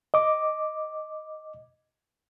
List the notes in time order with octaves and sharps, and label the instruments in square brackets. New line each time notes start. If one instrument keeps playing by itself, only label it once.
[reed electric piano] D#5 D6